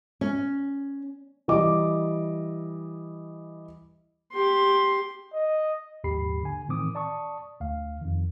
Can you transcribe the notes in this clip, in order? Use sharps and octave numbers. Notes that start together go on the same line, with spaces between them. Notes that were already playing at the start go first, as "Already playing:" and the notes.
C#4
E3 G3 D#5 D6
G4 C6
D#5
A#1 D#2 G#2 G4 B5 C7
D3 G#5
A2 D#3 E3 C4 D6 D#6
D5 A5 C#6 D#6
D2 F5
F2 D#3